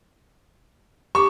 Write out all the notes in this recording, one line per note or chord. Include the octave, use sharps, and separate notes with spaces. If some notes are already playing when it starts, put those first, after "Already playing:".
G4 C#6 D6